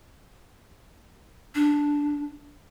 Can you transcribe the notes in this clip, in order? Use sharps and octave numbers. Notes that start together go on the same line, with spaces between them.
D4